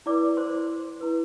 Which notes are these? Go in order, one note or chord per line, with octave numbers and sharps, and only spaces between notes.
E4 B4 D5 D6
C5 C6
E4 B4